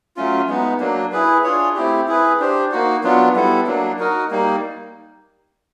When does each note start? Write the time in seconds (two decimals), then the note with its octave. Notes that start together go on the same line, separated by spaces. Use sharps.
0.16 F#3 A3 C#4 F4
0.48 G#3 B3 D#4
0.80 F#3 A#3 D4
1.12 E4 G#4 B4
1.44 D4 F4 G#4 C#5
1.76 A3 C4 E4 G4
2.08 E4 G#4 B4
2.39 D4 G4 C5
2.71 A#3 D#4 F#4
3.03 F#3 B3 D4 F4
3.35 G3 B3 E4 A4
3.67 F#3 A#3 D4
3.99 D#4 F#4 A#4 D#5
4.30 G3 A#3 D#4